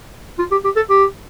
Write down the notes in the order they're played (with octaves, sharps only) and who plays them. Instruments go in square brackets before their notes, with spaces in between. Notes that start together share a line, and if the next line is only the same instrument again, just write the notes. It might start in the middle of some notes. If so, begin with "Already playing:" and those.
[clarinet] F4
G4
G4
A4
G4